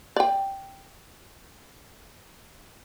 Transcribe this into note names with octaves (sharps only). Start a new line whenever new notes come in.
D5 G5